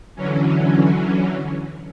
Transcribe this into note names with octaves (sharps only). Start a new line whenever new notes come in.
D3 E3 F#3 C#4